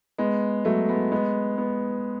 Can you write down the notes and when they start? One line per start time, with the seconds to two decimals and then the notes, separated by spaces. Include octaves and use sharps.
0.18 G#3 B3
0.65 F#3 A3
0.89 G#3 B3
1.12 G#3 B3
1.58 B3